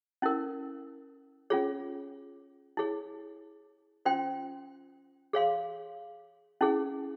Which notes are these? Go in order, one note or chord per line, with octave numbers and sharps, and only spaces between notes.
C#4 E4 A#4
C#4 F4 G#4 C#5
E4 G#4 C#5
C#4 F4 C5 G5 C6
G#4 C#5 F5 C6
C#4 E4 G#4